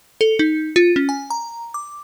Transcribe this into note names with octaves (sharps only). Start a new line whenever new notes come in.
A4
D#4
F4
C#4
G#5
A#5
D6